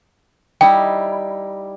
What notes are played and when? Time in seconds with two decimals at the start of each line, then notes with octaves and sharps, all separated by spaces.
0.61 G3 D#4 E4 G5